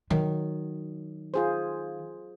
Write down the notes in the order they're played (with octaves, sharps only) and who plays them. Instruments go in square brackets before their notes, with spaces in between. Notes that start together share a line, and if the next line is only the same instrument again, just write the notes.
[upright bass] D#3 [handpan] F#3
[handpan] F4 G#4 C5